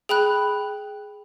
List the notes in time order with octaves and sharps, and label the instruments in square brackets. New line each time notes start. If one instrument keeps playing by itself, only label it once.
[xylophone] G#4 G5 B5 F#6